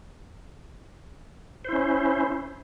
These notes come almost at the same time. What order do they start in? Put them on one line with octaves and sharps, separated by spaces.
C5 E4 C#4